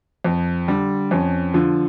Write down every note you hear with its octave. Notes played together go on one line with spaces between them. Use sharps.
F2
D3 G3
F2 C#4
D3 F3